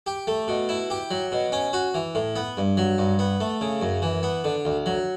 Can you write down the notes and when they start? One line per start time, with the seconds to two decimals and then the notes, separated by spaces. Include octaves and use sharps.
0.07 G4
0.27 A3
0.48 B2
0.69 E4
0.90 G4
1.11 F#3
1.32 B2
1.52 C#4
1.73 F#4
1.94 E3
2.15 A2
2.36 B3
2.57 G2
2.77 F#3
2.98 G2
3.19 B3
3.40 A3
3.61 C#3
3.82 F#2
4.02 E3
4.23 B3
4.44 D3
4.65 D2
4.86 F#3